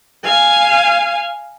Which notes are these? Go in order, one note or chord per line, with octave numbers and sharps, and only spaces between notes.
F5 G#5